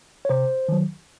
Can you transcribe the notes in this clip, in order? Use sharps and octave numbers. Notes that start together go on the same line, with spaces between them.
C#5
C3 C5
D#3 F#3